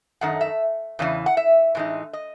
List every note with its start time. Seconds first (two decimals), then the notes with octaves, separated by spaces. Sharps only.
0.21 F#2 D#3 A3 D#4 F#5
0.41 E5
0.99 E2 C#3 E3
1.26 F#5
1.37 E5
1.75 A2 E3 G#3 D#4
2.13 D#5